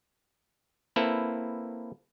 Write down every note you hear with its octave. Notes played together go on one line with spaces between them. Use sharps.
A#3 C4 E4 A4 B4